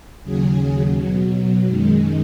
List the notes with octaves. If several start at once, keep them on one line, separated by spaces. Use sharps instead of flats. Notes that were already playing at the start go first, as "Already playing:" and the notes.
D#2 C#3 F#3 G#4
B2 F#3
F#2 D#3 G#3